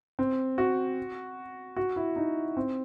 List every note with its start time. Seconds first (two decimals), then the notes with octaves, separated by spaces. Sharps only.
0.19 C4
0.58 F#4
1.76 F#4
1.96 E4
2.16 D#4
2.57 C4